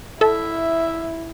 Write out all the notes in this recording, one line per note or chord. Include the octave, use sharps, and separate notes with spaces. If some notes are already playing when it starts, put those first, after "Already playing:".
E4 A4 E5